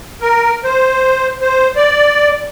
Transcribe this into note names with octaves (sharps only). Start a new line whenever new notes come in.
A#4
C5
C5
D5